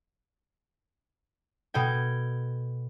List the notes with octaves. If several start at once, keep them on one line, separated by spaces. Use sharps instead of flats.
B2 A4 G5 G#6